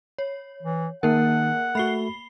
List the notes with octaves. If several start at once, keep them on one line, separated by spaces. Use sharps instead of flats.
C#5
E3
D#3 A#3 A#4 F#5
A3 F#4 B5 C7 G7